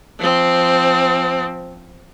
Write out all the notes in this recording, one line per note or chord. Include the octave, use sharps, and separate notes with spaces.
F3 C4